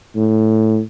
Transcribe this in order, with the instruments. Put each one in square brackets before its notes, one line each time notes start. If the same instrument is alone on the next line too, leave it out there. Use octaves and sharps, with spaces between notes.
[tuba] A2